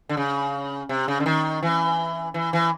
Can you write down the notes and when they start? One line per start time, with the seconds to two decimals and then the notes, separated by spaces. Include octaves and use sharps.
0.09 D3
0.17 C#3
0.89 C3
1.08 C#3
1.20 D3
1.26 D#3
1.63 E3
2.34 E3
2.53 E3